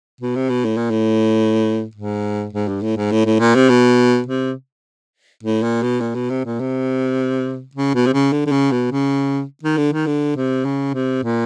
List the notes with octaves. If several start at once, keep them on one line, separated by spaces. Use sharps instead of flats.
B2
C3
B2
A2
A#2
A2
G#2
G#2
G2
A2
G#2
A2
A2
A#2
C3
B2
C3
A2
A#2
B2
A#2
B2
C3
A#2
C3
C#3
B2
C3
C#3
D3
D3
C#3
B2
C#3
D#3
D3
D#3
D3
C3
C#3
C3
A#2